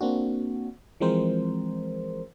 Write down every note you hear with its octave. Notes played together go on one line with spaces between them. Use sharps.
A#3 C4 D4 F#4
E3 F3 G#3 C4 A#4 C5